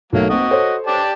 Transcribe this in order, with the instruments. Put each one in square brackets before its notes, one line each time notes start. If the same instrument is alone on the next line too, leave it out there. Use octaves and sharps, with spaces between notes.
[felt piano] B1 A3 [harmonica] F#3 A#3
[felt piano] A#3 C4 [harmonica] F#4 D#5
[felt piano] A4 C5 C#5
[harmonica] G4 D5 A5